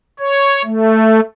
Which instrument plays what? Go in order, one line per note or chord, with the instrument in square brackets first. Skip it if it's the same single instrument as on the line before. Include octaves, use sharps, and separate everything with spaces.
[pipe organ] C#5
A3